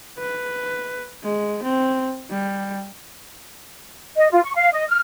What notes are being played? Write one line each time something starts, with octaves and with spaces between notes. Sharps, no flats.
B4
G#3
C4
G3
D#5
F4
C#6
F5
D#5
F6